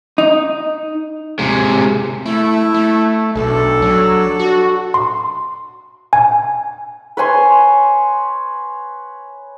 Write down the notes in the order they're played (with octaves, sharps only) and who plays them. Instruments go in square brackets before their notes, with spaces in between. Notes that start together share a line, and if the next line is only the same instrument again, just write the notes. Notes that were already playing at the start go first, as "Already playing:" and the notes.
[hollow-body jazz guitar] D#4
[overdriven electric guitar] C3 G#3
[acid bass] A3 [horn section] E4
[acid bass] A3
[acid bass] B1 [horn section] D4 A4
[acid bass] F#3
F#4
[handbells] C6
G#5
[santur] B4 C#5 G#5 C6